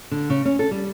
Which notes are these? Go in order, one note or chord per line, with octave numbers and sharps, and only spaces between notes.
D3
C#3
C#4
A4
G3